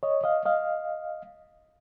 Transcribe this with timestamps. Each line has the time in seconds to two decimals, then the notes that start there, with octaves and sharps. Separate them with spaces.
0.03 C#5 D#5
0.24 D#5 F5
0.45 D#5 F5